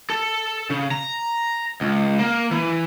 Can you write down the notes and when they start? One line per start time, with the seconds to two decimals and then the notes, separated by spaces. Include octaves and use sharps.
0.10 A4
0.70 C#3
0.91 A#5
1.81 C#2
2.19 A#3
2.51 E3